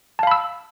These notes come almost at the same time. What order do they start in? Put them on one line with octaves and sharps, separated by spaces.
A5 F5 B5 E6